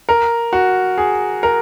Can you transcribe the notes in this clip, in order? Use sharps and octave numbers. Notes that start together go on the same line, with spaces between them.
A#4
F#4
G#4
A#4